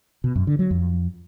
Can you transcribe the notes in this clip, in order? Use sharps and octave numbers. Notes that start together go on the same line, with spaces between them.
B2
F#2
D3
F#3
F2